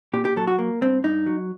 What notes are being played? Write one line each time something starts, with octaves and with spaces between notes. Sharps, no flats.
A#2 G4
G4
F#3 A4
F#4
A#3
G2 C4
G2 D#4
F#3